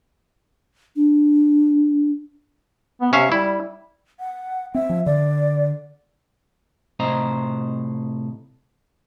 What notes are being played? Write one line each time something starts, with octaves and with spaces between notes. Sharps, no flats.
D4
B3
C3 C#4 E5 F5
G3 E4
F#5
C4 E5
F3
D3 D5
A2 C3 C5 D#5 A#5